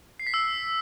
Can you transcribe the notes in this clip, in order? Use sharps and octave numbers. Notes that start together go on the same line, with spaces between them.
C7
B6
E6